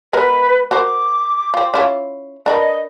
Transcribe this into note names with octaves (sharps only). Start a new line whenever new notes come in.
G#3 B3 A#4 B4
F#4 A#4 C5 D6
C4 F4
C#4 E4 F4
D4 A#4 B4 D#5